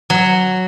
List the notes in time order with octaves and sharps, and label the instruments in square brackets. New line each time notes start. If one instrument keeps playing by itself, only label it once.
[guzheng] F#3